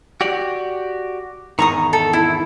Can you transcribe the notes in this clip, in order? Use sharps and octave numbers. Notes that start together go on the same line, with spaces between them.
F#4 G4 D5
E2 G#2 D#3 A#5 C#6 D#6
A4
E4